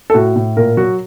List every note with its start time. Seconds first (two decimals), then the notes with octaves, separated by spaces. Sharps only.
0.10 A4
0.14 A2 F#4
0.36 A2
0.57 A#2 A#4
0.77 F#3 F#4